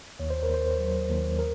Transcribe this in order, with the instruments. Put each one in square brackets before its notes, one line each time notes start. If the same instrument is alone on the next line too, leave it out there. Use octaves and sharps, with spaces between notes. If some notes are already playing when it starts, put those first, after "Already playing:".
[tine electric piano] D#2 C#5
C5
A#4
D#2 C5
F#3
D#2
A#4